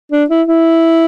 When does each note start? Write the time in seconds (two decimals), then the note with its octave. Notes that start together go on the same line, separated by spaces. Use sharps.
0.12 D4
0.30 E4
0.48 E4